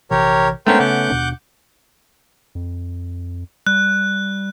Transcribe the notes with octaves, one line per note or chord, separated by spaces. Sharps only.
A#1 C3 E3 G4 A#4 C#5
G#3 A3 B3 C#4 D4 A#4 C5 G5
C#3 F#5 D6 G6
D#2 B2 D4
F2
G3 F#6